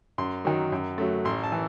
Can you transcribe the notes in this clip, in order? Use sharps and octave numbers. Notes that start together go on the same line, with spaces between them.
F#2 C6
D#3 F#3
F#2
F#3 A3
A1 C6
A5
E3